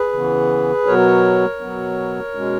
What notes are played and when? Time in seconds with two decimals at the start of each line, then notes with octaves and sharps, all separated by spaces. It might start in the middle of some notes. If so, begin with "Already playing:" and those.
Already playing: G#4 B4
0.13 C#3 E3 B3
0.86 B2 F#3 B3 A#4 C#5
1.60 B2 F#3 B3
2.35 B2 G#3 C#4